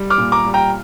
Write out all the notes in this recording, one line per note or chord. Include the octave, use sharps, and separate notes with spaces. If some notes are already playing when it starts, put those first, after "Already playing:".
Already playing: G3
D6 F6
A#2
A#5 D6
G3
G5 A#5